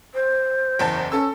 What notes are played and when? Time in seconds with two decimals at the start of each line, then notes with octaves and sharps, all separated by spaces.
0.14 C5
0.79 F#1 E2 A5
1.12 C#4 A4 E6